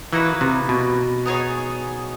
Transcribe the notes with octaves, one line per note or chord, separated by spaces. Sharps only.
E3 A#3 D#4 F#4 B4
C3
B2
B3 D#4 G#4 C#5